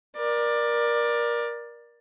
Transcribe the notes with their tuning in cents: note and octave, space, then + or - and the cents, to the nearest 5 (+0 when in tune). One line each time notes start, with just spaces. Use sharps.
A#4 +25 D5 +15